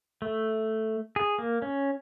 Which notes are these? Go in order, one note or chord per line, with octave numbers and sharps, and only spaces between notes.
A3
G#4
A#3
C#4